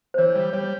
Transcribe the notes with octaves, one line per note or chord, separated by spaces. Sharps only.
C5
E3 C#5
G3
G3 C#5